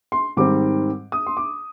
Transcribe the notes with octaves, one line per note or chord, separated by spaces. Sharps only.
C6
G#2 D#3 G3 C4 D6
D#6
C6
D6